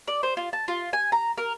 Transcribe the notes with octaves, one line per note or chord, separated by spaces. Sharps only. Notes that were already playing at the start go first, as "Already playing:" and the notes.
D5
C5
F4
A5
F4
G#5
A#5
A#4